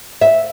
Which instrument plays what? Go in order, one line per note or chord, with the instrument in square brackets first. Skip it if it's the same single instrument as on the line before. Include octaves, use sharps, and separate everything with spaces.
[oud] E5